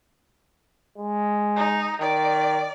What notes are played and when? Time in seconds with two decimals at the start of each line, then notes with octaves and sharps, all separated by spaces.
0.98 G#3
1.56 D#4
2.01 D#3 D5